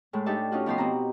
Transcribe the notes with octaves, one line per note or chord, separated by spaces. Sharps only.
A2 G#3 A3
D4 D#4 G4 A4 E5 A5
C#4 D#4 F4 F#4
B2 F3 F#4 G4 B4 C6
B2 C4 A#5